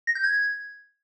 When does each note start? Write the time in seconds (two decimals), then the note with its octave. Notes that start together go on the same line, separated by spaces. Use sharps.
0.07 A#6
0.15 G6
0.24 G#6